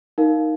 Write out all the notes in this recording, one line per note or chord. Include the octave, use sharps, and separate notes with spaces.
D#4 A#4 F5